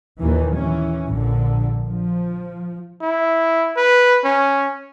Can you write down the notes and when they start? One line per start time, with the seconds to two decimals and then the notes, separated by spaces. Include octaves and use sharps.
0.19 D#2 A#2 D#3 E3
0.55 E3 C#4
1.10 A#1 D3
1.89 F3
3.02 E4
3.77 B4
4.25 C#4